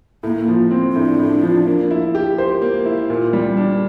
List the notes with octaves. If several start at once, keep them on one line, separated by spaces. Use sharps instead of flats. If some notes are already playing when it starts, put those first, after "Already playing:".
A2 A#3
F3
C4
A2 D4
A2
F3
A#3
E4
G4
C5
A#3
E4
A#2
G3
D4